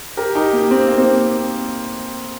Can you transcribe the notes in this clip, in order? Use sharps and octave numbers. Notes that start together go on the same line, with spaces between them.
G4 A#4
D#4 G4
A#3
C4
A#3
C4